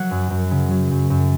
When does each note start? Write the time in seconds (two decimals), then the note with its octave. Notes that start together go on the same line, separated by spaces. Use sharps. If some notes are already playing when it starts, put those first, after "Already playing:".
Already playing: F#3 F#5
0.11 F#2
0.30 F#2
0.51 C#3
0.71 F#3
0.91 F#2
1.10 F#2